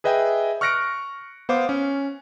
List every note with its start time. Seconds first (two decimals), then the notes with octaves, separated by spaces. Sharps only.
0.04 G#4 B4 D#5 E5 G5 G#5
0.61 C#6 F6 F#6 A#6 C#7 D7
1.49 B3 C5 F5 D6
1.69 C#4